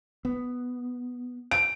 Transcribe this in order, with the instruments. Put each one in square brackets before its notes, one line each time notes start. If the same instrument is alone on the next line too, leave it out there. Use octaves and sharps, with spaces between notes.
[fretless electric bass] B3
[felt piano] D7